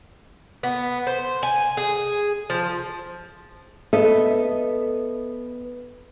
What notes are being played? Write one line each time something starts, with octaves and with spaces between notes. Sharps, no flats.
B3
C5
G#5
G#4
F3
B3 A4 D#5 E5